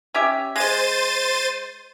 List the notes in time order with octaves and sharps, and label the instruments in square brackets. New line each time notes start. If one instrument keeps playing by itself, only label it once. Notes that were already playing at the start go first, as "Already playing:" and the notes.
[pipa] C#4 G4 E5
[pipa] G#3 [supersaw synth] C5 A6 D#7